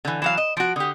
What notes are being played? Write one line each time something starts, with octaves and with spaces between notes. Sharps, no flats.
D3 E3
E3 F#3 F5 E7
D#5
F3 F#4 D7
D3 G4 D#6